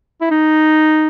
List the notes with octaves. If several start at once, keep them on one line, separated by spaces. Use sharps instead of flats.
E4
D#4